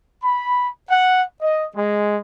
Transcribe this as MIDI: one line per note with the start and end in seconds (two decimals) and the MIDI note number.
0.22 0.67 83
0.89 1.23 78
1.41 1.66 75
1.75 2.16 56